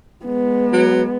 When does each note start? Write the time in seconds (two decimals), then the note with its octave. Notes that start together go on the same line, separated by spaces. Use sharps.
0.25 G#3 B3
0.73 F#3